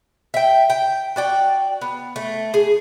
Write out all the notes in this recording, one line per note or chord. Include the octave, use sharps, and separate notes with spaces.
E5 G5
G5
F#4 D5 G5
B3
A3
G#4